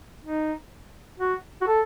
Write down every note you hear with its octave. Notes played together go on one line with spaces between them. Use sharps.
D#4
F#4
F#4
A4